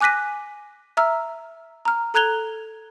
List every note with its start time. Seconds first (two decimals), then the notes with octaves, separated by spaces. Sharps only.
0.01 G#5 D6 F#6 A#6 B6 D#7
0.97 E5 A#5 E6 F6
1.85 A#5 F6
2.14 A4 A#5 F#6 G#6 F7 G7